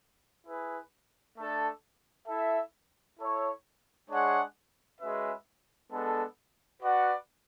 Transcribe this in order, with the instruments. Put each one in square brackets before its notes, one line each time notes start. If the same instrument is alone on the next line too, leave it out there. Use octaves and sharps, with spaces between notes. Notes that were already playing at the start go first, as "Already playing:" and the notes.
[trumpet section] E4 G#4 B4
A3 D4 A4
E4 A4 E5
E4 A4 C#5
G#3 D4 G#4 C#5 F#5
G#3 C#4 F#4 B4 E5
G#3 B3 D4 A4
F#4 B4 D5 F#5